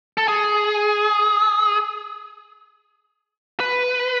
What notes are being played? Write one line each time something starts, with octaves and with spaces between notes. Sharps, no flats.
A4
G#4
B4